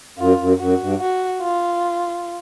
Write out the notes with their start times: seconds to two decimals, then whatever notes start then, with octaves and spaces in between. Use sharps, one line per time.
0.18 F#2 F4
0.39 F#2
0.59 F#2 F#4
0.80 G2
1.00 F#4
1.42 F4